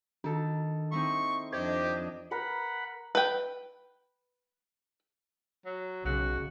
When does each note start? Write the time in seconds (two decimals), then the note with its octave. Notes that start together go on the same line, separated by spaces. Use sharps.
0.24 D#3 D4 A4
0.92 C4 D#4 E4 C#6
1.53 F2 D4 G4 C5 D#5 G#6
2.31 A#4 B4 F#5 G5 B5
3.15 B4 G5
5.66 F#3
6.05 B1 C#3 F#4